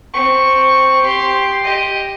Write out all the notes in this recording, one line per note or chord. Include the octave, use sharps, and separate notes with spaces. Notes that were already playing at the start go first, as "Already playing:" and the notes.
C4 C#6
G4 C6
G4 D#5